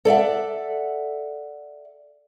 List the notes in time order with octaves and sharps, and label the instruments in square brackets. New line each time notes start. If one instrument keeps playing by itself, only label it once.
[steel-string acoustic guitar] A4 D5 E5 F#5